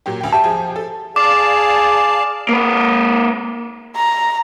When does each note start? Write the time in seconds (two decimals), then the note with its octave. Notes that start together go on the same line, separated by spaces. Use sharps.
0.06 A#2 F#3 G4
0.21 D2 G5
0.33 G4 E5 G5 A5
0.44 F3 G4 G#4
0.76 A4
1.16 G#4 D5 F5 A5 D6
2.49 A#3 B4
3.96 A#5